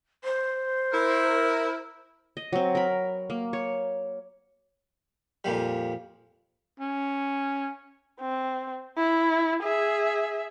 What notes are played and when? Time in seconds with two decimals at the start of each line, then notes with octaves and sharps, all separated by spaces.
0.24 C5
0.92 E4 A#4
2.37 D#5
2.52 F#3 C4
2.75 A#4 B5
3.30 A#3
3.53 C#5
5.44 F2 A#2 G3
6.80 C#4
8.21 C4
8.97 E4
9.63 G#4 E5